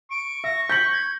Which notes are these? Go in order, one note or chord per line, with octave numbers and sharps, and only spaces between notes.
C#6 D7
E5 A#6
G6 A#6 B6 F#7
G#6